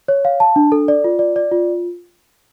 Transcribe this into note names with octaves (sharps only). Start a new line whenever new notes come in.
C#5
F5
A5
D4
A4
D5
F4
D5
D5
F4